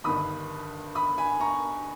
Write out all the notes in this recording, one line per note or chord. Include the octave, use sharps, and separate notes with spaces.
G1 G2 D#3 B5 D#6
B5 D#6
G#5 B5
A#5 C#6